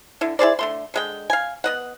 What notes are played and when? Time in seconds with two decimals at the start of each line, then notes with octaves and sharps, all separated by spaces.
0.21 D3 E4
0.39 E4 G#4 C5 D5
0.59 D3 A3 C6
0.94 D3 G#3 G5
1.30 F5 G#5
1.64 B3 D#5 F#5